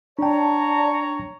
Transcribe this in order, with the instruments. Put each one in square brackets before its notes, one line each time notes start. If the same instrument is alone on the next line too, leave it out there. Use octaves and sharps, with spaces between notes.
[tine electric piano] D4 G5 [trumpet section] C#5 A#5 [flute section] D5 A5